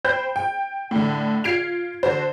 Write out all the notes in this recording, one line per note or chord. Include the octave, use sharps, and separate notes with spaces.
C5 G5 B5 G6
G5
A2 D3
F4 G#6 C7 D7 F7
D3 F#4 C5